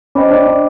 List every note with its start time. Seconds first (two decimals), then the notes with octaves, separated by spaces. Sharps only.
0.15 C#4 C5 D#5 G5 B5 D6
0.31 D4
0.47 D4